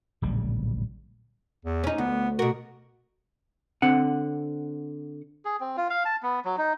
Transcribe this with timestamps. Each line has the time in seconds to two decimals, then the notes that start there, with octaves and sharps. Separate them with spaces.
0.22 D1 A#1 C#3 G3
1.65 E2
1.84 C#4 D#4
1.98 D2 B3
2.39 B2 F#4 A#4
3.82 D3 C4 F#5
5.45 G#4
5.60 C4
5.77 F4
5.90 F5
6.05 A5
6.23 B3
6.45 F#3
6.58 D#4